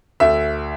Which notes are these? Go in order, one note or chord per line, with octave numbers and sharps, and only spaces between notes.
D2 E5